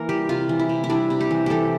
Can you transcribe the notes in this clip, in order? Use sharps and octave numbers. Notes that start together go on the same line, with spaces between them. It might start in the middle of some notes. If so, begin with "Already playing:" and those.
Already playing: E3 A#3 A#4
G3 G4
C3 F4
E3
E4
C3
E4
G3 D4
C3
G4
E3
E3 G4 A4